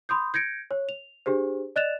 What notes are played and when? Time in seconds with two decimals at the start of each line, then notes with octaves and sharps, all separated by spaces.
0.09 B5 C6 D#6 G6
0.34 G6 G#6 A#6 C#7 D7
0.71 C#5
0.89 F7
1.26 D4 G4 G#4 C5
1.76 D5 D#5 F#6 A6 E7 F7